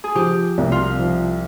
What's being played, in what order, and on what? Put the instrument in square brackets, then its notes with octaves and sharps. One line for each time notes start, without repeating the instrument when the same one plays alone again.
[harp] G#4
[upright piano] F3 [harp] G4
[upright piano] C2
[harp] F4
[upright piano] F3